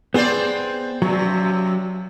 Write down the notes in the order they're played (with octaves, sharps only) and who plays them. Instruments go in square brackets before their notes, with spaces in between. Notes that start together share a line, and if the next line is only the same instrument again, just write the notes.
[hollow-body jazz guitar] B3 G#4 [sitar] C4 C5 D5
[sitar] F#2 C3 [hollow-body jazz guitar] F#3